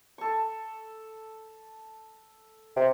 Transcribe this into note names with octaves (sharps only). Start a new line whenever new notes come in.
A4 C#6
C3